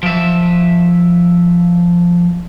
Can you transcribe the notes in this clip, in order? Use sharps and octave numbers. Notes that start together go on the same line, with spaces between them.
F3 E5